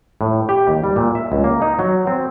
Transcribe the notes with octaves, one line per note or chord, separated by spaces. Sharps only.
A2
G4
D#2
G3
A#2
E5
C#2
A#3
D#4
F#3
C4